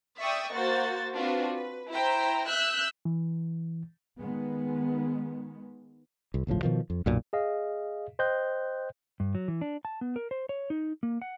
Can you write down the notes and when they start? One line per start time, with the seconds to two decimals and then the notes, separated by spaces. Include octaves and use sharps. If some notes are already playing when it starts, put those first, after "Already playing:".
0.20 D5 E5 G5 C#6 D#6
0.53 A#3 F#4 C5 A6
1.15 C4 D4 F4 F#4 B4
1.52 B4
1.91 E4 C5 G5 A#5
2.49 E5 E6 F#6 G6
3.05 E3
4.18 D#3 G#3 B3
6.34 C2
6.47 G1 C#2 A2 F3
6.63 B2 D#3 F3
6.90 F2
7.06 B1 F#2 A#2
7.33 G#4 D#5 F5
8.19 C5 D#5 G5 F#6 G6
9.20 G2
9.35 F#3
9.48 E3
9.61 D4
9.85 A5
10.01 B3
10.16 A#4
10.31 C5
10.49 C#5
10.70 D#4
11.03 A#3
11.22 F#5